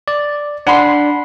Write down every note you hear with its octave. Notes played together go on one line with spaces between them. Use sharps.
D5
D4 F#5 B5 C6